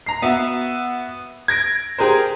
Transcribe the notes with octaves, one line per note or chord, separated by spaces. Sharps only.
A#5 C7
B3 F#4 E5
G#6 A#6 D7
G4 G#4 A#4 C5